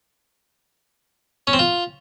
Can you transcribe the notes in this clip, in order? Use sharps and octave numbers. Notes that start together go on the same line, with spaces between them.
C#4
C4
F4